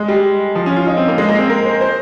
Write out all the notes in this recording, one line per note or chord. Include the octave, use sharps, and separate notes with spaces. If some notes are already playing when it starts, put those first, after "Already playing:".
Already playing: G#3
G3
F3
C#4
F4
D#4
C4
A#3
G#3
A#3
C4
A#4
C5
C5